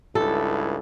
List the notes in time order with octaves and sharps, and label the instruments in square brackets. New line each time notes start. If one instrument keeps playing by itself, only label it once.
[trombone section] C#2 G2 E4 [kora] A4